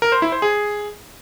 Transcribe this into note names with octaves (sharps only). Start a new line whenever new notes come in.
A#4
C5
E4
C5
G#4